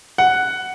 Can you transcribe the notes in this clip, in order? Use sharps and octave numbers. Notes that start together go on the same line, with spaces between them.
F#5